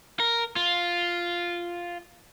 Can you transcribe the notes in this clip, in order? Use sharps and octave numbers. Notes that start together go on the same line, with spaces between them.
A#4
F4